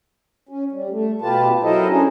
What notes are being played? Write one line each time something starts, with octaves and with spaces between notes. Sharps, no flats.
C#4
G3
A3
B2 F4 G4 B4 A5
F#3 E4 A4 A#4 C5 D#5
C#4 D4 G#4